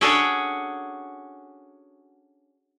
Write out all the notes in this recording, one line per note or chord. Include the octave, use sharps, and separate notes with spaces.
C#4 D4 F#4 G#4 A4 C#5